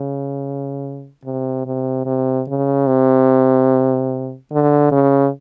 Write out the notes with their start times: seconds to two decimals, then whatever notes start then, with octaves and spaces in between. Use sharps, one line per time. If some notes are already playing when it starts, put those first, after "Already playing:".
Already playing: C#3
1.24 C3
1.66 C3
2.06 C3
2.47 C#3
2.87 C3
4.52 D3
4.92 C#3